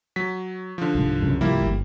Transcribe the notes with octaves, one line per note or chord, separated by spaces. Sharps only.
F#3 B6
D3 F3
C2 G#2
C2 F#2 C#3
C2 G#2 F3 G3 A#3 E4
G1